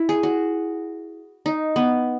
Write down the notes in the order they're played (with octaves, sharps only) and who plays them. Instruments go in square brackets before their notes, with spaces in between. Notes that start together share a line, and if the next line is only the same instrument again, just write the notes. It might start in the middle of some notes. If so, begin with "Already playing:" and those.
Already playing: [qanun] E4
G#4
F#4
D#4
B3